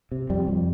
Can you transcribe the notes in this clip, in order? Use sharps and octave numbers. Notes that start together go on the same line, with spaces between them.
C3
F2 G3
F2